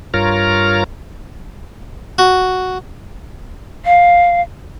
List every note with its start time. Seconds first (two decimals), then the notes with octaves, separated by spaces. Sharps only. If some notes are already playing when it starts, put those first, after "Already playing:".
0.14 G2 F4 A#4 C#5 A#5 F6
2.18 F#4
3.84 F5